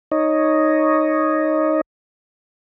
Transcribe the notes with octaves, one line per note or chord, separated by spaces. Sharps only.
D#4 C#5 D#5